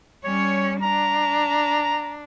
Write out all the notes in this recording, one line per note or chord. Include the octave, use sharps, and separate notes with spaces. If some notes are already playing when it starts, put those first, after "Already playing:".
G3 C#4 C#5
D4 A#5